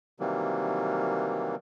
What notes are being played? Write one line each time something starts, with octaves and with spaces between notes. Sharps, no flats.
C3 D#3 E3 F#3 G3 A#3